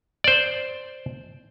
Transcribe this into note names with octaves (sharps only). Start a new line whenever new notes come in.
C5 D5